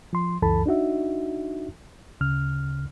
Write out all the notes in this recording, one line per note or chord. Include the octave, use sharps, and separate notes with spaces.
F3 C6
C#2 F#2 E3 A4 A5 B5
D4 D#4 F#4 E5
D2 C#3 F6